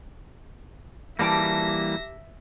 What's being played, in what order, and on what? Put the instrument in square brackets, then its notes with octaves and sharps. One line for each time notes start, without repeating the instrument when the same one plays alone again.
[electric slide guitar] E3 G3 A#3 [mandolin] G4 A5 D6 [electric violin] E5 A#6